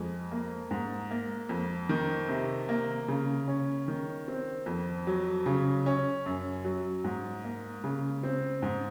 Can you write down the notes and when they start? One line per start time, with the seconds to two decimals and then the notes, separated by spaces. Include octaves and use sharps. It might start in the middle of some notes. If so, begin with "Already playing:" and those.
Already playing: F2 G#3
0.32 A#3
0.71 G#2
1.11 A#3
1.49 F2
1.89 D#3
2.29 C3
2.69 A#3
3.08 C#3
3.48 C#4
3.88 D#3
4.28 C4
4.66 F2
5.07 F#3
5.46 C#3
5.86 C#4
6.26 F#2
6.64 F#3
7.04 G#2
7.44 A#3
7.84 C#3
8.23 C4
8.62 G#2